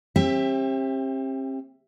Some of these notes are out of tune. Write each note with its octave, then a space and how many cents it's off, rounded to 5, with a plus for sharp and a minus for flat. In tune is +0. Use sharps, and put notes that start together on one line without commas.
C4 +40 G4 +20 E5 +0